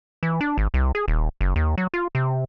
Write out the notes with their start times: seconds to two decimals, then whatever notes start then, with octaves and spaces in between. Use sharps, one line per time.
0.23 E3
0.41 D4
0.58 G#1
0.74 C2
0.95 G#4
1.08 D#1
1.41 F#1
1.56 D#2
1.78 F#3
1.94 F4
2.15 C3